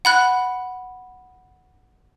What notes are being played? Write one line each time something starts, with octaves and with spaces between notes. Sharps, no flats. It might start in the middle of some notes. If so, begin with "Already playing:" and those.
F#5 B5 F#6